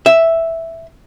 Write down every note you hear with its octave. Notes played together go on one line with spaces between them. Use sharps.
E5